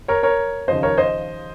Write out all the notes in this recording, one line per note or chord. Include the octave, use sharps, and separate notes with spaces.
A#4 C#5
A#4 C#5
D#2 C#3 F3 C5 D#5
A#4 C#5
C5 D#5